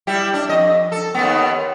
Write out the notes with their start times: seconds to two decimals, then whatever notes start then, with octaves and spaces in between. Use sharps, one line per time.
0.07 G3 E4 G4
0.34 D4
0.49 F2 D#5
0.92 A4
1.14 D#2 D#3 B3